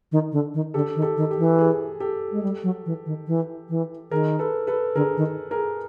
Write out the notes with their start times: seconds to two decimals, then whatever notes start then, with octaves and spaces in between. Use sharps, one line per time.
0.12 D#3
0.32 D3
0.54 D#3
0.74 D3 G4 A4
0.96 D#3
1.02 G4 A4
1.17 D#3
1.31 G4
1.37 E3
1.59 G#4
2.00 G4 A4
2.32 G#3
2.43 G3
2.63 F#3
2.86 E3
3.06 D#3
3.27 E3
3.69 E3
4.11 D#3 G#4 A#4
4.39 A4 B4
4.67 A4 B4
4.95 D3 G#4 A#4
5.17 D#3
5.51 G#4 A#4